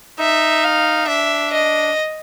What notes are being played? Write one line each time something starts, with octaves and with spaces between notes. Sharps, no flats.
D#4 E5
F5
D4 E5
D#5